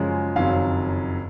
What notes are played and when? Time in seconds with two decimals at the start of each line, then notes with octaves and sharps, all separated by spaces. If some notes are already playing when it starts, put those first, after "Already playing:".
Already playing: F#2 C#3 F3 G#3
0.36 F#1 F2 D#3 F#3 F5